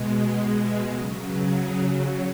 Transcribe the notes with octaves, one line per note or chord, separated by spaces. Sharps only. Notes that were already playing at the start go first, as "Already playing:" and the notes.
Already playing: B2 G#3
D#5
E5
C#3 F#3
B4
G#4